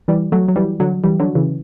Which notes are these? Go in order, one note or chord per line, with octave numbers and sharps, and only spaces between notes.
E3 G3
F#3 A3
F#3
E3 G3
D3 F#3
E3 G3
D3 F#3
C#3 E3